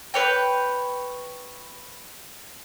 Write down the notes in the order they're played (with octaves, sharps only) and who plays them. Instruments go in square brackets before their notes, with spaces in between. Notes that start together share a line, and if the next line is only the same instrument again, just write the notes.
[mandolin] B4 C#5 G5